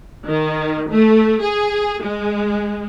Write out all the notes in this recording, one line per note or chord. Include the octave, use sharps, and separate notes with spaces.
D#3
A3
G#4
G#3